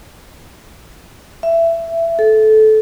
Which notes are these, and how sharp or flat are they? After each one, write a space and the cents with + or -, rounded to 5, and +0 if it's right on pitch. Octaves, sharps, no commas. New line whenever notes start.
E5 +15
A4 -20